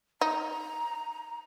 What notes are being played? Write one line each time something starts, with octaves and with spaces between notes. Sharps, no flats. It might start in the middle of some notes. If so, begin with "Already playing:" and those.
D#4 A#5